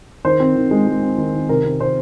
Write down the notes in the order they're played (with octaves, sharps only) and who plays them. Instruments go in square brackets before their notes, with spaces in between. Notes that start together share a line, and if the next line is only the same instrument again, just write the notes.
[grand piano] D#3 C5
C4
D#3
G#3
G#3
C4
D#3
D#3
C3 A#4
C4
C3 C5